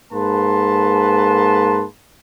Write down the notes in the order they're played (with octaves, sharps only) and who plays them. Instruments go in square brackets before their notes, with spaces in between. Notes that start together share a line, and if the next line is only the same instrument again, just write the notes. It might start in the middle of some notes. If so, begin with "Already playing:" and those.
[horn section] G#2 A#3 A4 B4 A5 C6